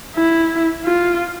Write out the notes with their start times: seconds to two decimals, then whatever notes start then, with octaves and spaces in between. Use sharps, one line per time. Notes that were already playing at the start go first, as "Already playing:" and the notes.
0.16 E4
0.85 F4